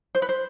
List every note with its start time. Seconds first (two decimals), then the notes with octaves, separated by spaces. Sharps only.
0.15 C5
0.22 B4
0.29 C5